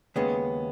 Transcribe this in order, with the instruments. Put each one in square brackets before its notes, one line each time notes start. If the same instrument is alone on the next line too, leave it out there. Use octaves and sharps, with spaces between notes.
[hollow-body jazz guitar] D#2 C#3 G#3 [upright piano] B3